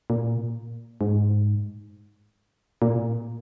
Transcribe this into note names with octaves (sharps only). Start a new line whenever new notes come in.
A#2
G#2
A#2